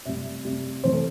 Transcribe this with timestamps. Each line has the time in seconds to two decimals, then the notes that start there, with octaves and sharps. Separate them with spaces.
0.06 C3 G3 E5
0.45 C3 G3
0.83 C3 E3 A3 C5
0.93 A4